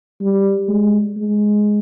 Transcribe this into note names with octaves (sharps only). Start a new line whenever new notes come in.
G3
G#3
G#3